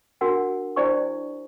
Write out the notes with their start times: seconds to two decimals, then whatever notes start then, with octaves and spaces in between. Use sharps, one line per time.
0.21 D4 F#4 A#4 F#5 G#5
0.76 D4 E4 C5 D5 G#5 C#6